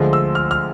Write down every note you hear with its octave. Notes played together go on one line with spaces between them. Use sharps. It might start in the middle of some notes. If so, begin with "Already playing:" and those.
Already playing: D2 D3 F3 G#3 C6
E6
F6
F6